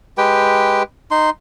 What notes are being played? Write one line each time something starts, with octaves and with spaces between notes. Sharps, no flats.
G#3 G4 B4 G5
D#4 C6